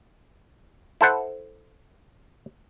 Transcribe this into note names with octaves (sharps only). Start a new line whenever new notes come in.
E4 A4 C5 F#5